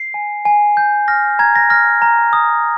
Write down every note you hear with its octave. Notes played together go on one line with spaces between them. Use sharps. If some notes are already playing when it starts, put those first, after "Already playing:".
Already playing: C7
G#5
G#5
G6
F6 A#6
A#5 G#6
A#6
F6 A#6
A#5
D#6